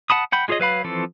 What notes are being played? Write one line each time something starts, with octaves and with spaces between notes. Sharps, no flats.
F#5 A5 B5 D#6
F#5 G5 B5
G#3 F4 G#4 C#5 D#5
F#3 B4 F5 B5
E3 F3 C4 A4